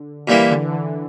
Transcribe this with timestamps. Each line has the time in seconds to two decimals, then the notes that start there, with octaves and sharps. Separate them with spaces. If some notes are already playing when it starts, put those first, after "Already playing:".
Already playing: D3
0.28 A#2 E3 G3 A#3 E4
0.51 D3
0.72 E3